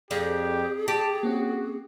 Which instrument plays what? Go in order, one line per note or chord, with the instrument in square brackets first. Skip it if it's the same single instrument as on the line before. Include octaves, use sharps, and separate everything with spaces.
[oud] F2 [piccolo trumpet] G4 [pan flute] G#4 [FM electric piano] D5
[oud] G4 [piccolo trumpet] A5
[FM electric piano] A#3 C4 C#4 [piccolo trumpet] F#4